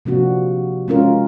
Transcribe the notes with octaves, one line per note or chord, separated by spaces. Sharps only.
C3 F3 A#3 D4 F#4
G#3 C#4 F4 A#4